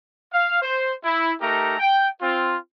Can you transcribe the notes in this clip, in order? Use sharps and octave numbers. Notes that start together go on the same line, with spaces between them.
F5
C5
E4
A3 D#4 G4 A#4 A#5
G5
C4 F4